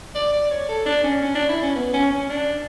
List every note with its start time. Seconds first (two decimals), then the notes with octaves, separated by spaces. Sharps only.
0.15 D5
0.33 D5
0.51 C#5
0.69 A4
0.86 D4
1.04 C#4
1.22 C#4
1.35 D4
1.49 E4
1.62 C#4
1.76 B3
1.93 C#4
2.11 C#4
2.29 D4